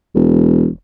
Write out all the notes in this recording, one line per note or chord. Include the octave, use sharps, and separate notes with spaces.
E1